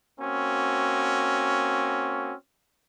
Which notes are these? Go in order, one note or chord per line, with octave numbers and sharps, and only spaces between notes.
A#3 C4 C#4 F#4